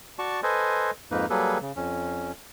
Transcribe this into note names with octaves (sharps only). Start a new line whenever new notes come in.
F#4 D5 A5 C#6
A4 B4 C5 D#5 G#5
F2 G#2 A#3 D#4 B4
F#3 G3 A#3 G#4 A4 B4
C#3
F2 C#4